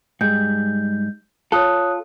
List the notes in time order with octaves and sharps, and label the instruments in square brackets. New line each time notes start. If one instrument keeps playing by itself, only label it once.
[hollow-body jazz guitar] G#2 G3 [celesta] G6
[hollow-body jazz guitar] F4 A4 [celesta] C#5 D#6 F#6